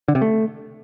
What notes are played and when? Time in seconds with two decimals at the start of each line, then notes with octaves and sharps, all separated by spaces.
0.08 D3
0.15 C3
0.22 A3